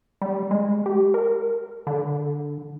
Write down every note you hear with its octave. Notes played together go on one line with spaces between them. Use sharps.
G3
G#3
G4
A#4
D3